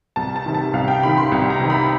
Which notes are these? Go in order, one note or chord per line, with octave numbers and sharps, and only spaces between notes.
C2 A5
A5
C3 D#3
A5
C2 F5
G5
C3 D#3 B5
C6
C2
A#5
C3 D#3
B5